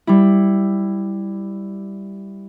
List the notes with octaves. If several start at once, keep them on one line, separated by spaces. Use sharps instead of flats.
G3 E4